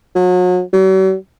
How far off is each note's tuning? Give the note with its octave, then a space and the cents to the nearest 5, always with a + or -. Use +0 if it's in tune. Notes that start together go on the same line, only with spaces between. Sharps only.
F#3 -35
F#3 +45